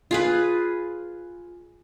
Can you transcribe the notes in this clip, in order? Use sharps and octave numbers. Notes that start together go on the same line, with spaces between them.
F4 G#4 B4